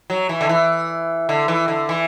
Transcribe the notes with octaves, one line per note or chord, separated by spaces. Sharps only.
F#3
E3
D3
E3
D3
E3
D3
E3